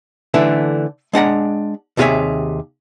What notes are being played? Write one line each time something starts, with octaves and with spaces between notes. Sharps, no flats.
D3 E3 A3 D4
G#3 D4 F#5 A#5
D#2 C3 F4 G#4 C#5 E5